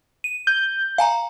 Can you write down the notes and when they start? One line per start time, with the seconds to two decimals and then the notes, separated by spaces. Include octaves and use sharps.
0.24 D#7
0.47 G6
0.98 F5 G#5 A#5